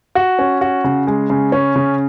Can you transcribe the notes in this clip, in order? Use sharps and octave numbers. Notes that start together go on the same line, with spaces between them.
F#4
C#4
F#4
C#3
G#3
C#3
C#4
C#3